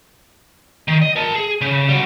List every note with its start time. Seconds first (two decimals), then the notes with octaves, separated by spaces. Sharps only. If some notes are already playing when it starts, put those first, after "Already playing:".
0.88 D#3
1.02 D#5
1.16 A#4 A5
1.35 G#4
1.61 C#3
1.89 G3 F#4